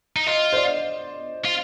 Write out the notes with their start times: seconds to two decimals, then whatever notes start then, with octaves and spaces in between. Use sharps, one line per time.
0.16 D#4
0.27 F4 D#5
0.53 C5
0.57 D5
1.45 F4